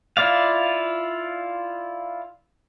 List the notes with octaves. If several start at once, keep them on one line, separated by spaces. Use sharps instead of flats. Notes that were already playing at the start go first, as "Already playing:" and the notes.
E4 F4 D5 F5